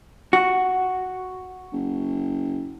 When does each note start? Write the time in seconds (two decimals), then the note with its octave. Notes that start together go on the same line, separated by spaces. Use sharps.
0.33 F#4
1.73 F#1